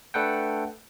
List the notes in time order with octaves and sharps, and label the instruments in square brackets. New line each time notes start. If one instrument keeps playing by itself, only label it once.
[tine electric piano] A3 D4 A4 B4 F#5 G5